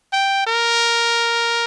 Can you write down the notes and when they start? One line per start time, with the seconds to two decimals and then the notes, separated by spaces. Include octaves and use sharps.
0.13 G5
0.47 A#4